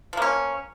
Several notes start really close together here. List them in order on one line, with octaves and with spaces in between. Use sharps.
F3 A#3 C#4